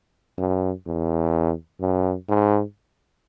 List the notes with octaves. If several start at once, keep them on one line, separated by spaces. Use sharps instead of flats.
F#2
E2
F#2
G#2